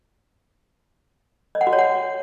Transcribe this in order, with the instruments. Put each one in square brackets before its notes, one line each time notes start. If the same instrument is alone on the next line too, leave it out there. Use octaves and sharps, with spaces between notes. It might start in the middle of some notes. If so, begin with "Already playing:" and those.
[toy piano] D#5
F#5
F#4
C#5
F#5